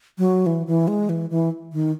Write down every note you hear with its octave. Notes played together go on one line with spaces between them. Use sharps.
F#3
E3
E3
G#3
E3
E3
D#3